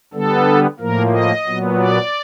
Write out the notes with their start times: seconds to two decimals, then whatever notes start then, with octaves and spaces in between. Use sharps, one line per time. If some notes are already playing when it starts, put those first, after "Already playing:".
0.14 D3 G3 B3 A4
0.80 A2 F3 A#3 A#4
1.12 D#5
1.46 A#2 F#3 B3
1.79 D5